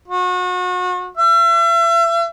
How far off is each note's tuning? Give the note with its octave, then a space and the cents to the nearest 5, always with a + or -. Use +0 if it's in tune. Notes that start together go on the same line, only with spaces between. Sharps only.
F#4 -35
E5 +40